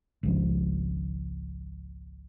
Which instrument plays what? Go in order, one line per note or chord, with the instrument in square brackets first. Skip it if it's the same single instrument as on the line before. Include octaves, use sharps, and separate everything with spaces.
[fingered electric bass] G#1 C#2 F3